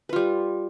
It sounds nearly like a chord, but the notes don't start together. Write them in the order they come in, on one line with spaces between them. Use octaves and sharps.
B4 F4 G3